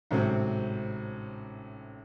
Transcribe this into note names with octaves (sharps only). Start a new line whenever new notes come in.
A1 G#2 C3 F#3 C4